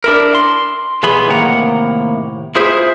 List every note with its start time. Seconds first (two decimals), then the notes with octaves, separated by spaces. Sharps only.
0.04 D4 E4 A#4
0.35 C6
1.03 B1 E3 B3 G#4 B5 C6
1.29 A2 C3 D#3 A#3 F#5 A#5
2.55 E4 F4 G#4 C5 E5